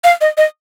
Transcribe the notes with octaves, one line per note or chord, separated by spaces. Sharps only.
F5
D#5
D#5